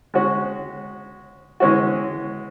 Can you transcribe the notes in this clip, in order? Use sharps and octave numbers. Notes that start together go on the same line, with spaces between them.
G#3 C#4 F#4
E3 G#3 C#4 F#4